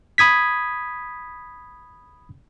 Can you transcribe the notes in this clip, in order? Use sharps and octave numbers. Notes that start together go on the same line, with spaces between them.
B5 D#6 G#6 B6